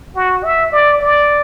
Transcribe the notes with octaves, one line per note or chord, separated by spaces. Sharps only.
F#4
E5
D5
D5